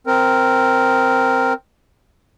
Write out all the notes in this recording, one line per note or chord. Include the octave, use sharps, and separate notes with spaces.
C4 A#4